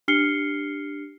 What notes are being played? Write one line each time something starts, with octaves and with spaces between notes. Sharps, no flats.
D4 G4 F6 C7 C#7 G7